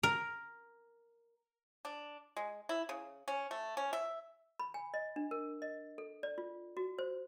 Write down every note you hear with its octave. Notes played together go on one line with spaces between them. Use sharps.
A#4
D4
G#3
E4
C#3
C#4
A3
C#4
E5
B5
G#5
D#5
D4
A#4
D#5
A4
D5
F4
F#4
C5